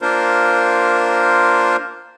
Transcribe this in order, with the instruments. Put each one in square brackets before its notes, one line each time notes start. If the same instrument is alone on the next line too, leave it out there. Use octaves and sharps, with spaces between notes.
[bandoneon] A#3 D4 F4 A#4 C5